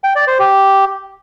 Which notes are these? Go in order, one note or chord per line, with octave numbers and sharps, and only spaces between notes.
G5
D5
C5
G4